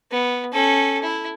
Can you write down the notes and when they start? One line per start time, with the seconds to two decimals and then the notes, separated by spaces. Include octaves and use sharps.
0.11 B3
0.52 C#4 A4
1.02 E4